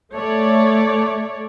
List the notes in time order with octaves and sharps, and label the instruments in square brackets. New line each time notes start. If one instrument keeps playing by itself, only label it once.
[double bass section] A3 [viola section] C#5 D5